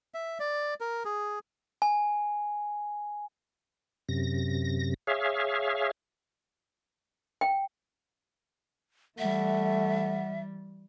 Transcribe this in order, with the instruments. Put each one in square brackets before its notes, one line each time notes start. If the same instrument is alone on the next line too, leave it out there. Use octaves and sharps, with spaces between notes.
[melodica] E5
D5
A#4
G#4
[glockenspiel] G#5
[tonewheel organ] F#2 C3 A#6
G#4 C#5 E5 F5
[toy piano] G5
[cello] E3 G3 [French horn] A3 [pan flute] E5 [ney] F#5